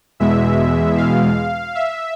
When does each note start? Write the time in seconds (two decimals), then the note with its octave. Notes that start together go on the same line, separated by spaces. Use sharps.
0.20 E2 B2 G#3 E5
0.98 F5
1.75 E5